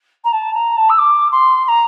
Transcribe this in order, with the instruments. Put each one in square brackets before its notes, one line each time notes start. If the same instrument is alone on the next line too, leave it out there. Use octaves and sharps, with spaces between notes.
[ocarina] A#5
A5
A#5
A5
E6
D6
C6
C6
A#5